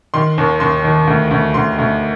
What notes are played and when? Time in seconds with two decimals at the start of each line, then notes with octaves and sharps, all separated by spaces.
0.14 D#3 C6
0.38 D#2
0.60 D#2 C6
0.84 D#3
1.07 D2
1.31 D2
1.54 D2 C6
1.79 D2